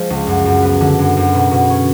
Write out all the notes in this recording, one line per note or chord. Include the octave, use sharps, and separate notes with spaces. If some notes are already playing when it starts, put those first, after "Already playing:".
Already playing: F3 G#3
C#2
F#2
F#2
B3
D3
F#2
F#2
B2
B2
C#4